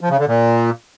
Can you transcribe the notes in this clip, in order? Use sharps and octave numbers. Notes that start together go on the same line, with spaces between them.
F3
C#3
D3
A#2